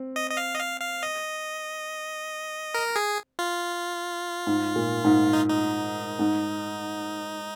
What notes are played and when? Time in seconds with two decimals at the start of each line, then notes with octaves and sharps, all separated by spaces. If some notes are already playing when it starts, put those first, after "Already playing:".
Already playing: C4
0.16 D#5
0.31 D#5
0.37 F5
0.55 D#5
0.59 F5
0.81 F5
1.03 D#5
2.74 A#4
2.96 G#4
3.39 F4
4.47 G#2
4.75 A#2
5.04 G#2
5.33 D#4
5.49 D#4
6.19 G#2